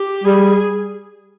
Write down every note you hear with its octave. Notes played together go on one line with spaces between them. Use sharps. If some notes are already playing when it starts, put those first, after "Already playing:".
Already playing: G4
G3 G#4